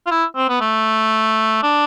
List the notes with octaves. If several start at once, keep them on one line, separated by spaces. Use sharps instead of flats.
F4
E4
C4
B3
A3
D4